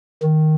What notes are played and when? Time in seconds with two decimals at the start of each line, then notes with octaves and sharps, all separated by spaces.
0.23 D#3